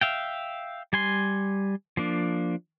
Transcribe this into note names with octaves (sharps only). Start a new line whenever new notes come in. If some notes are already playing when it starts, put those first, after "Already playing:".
E5 F5 G5
G3 G#5 C6
F3 A#3 D4